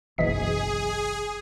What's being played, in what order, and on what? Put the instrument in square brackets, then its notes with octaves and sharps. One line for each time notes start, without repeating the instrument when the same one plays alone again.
[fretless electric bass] F#1 B1 [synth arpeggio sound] E3 D#5 B6 [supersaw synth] G#4